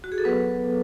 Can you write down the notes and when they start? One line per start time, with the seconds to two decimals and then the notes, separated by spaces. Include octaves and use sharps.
0.04 F#4
0.12 G#4
0.18 A4
0.25 F#3 B3 B4